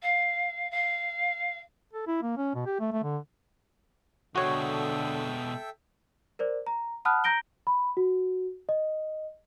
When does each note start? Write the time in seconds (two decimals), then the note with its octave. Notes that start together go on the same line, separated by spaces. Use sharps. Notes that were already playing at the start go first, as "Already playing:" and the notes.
0.02 F5
0.70 F5
1.93 A4
2.07 E4
2.23 A#3
2.37 C#4
2.54 B2
2.66 G4
2.80 A3
2.92 A3
3.03 D3
4.36 B2 D3 G#3 F#4 A4 C#5 E5 G5
6.39 A#4 C5 D5
6.67 A#5
7.05 F#5 A5 B5 D#6 F6 F#6
7.24 A#5 G6 A#6 D7 G7
7.67 B5
7.97 F#4
8.69 D#5